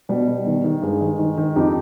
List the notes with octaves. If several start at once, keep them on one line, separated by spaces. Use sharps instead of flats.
B2 G3
B2
D#3
D#3
G2 G#3
D#3
D#3
D#3
F2 D#4 G4